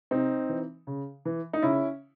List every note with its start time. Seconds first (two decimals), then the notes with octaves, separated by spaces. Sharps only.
0.11 C3 C4 D#4
0.49 E3
0.87 C#3
1.25 E3
1.53 D#4
1.62 C#3 C#4 E4